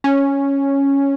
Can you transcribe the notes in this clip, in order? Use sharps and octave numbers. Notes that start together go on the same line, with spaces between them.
C#4